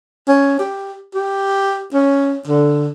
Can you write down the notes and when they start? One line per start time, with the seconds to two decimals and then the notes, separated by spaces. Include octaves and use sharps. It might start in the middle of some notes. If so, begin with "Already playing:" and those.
0.28 C#4
0.59 G4
1.14 G4
1.94 C#4
2.47 D3